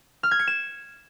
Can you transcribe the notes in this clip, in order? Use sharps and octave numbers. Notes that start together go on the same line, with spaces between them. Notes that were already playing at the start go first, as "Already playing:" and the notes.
F6
G#6
C#7
E7